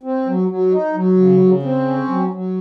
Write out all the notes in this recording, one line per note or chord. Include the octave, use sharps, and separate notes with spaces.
C4
F#3
F#3
D#4
F#3
C#3
C#3
C4
C#4
F#3
F#3